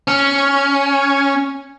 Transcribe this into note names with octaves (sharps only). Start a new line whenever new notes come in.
C#4